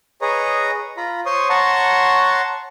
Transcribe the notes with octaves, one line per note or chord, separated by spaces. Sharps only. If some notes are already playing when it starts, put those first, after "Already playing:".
G#4 B4 C#5 D#5 A#5
F4 A#5 B5
C5 C#5 C6 C#6 D#6
C#5 F#5 A5 A#5 C6 C#6